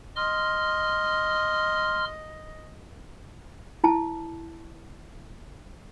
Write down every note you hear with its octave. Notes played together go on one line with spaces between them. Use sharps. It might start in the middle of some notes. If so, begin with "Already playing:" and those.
D#5 C6 F6
E4 A5